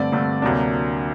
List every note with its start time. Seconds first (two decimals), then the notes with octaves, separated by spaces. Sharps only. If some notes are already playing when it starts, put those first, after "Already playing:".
Already playing: G2 D3 A3 C4 D5
0.12 G2 D3 A3 C4
0.42 D2 C3 F#3 A#3 D4